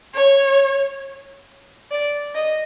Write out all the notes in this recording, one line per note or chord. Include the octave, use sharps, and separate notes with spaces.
C#5
D5
D#5